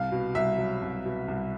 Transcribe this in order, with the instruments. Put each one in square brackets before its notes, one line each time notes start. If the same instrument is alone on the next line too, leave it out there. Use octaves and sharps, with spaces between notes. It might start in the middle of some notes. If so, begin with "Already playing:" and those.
Already playing: [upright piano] C2 F5
B2
C2 E5
F#3
C2
B2
C2